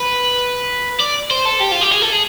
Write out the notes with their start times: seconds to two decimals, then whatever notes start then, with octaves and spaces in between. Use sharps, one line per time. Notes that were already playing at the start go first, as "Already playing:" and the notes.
Already playing: B4
1.00 D5
1.31 C5
1.46 A4
1.60 G4
1.72 F4
1.81 G4
1.92 G#4
2.02 A4
2.12 G#4